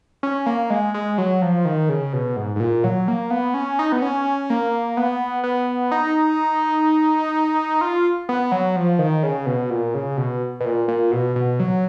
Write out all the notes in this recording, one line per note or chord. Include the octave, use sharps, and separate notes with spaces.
C#4
A#3
G#3
G#3
F#3
F3
D#3
C#3
B2
G#2
G#2
A#2
F#3
A#3
B3
C#4
D#4
B3
C#4
A#3
B3
B3
D#4
F4
B3
F#3
F3
D#3
C#3
B2
A#2
C#3
B2
B2
A#2
A#2
B2
B2
F#3